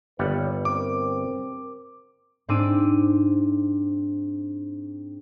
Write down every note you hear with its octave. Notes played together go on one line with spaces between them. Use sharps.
G1 D#2 G3 B4 C#5 F#5
C4 A#4 D6
G#2 C4 D4 D6 E6 D#7